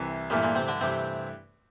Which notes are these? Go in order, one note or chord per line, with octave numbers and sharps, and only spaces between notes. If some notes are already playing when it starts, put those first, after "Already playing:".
Already playing: C2 C3 E3
G2 A#2 E3 A3 A#3 E4 G4
A#2 A#3
C3 C4
D3 D4
G2 C3 E3 A3 C4 E4 G4